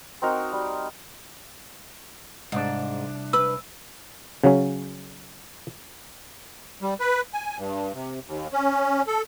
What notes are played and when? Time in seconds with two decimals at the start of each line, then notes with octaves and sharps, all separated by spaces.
0.22 C4 D#4 F#4 A#4
0.53 G3
2.52 C2 G#2 D4
3.33 B4 E6
4.44 C#3 F#3 C#4
6.82 G3
7.00 B4
7.33 G#5
7.57 G2
7.94 C3
8.27 D#2
8.52 C#4
9.07 A4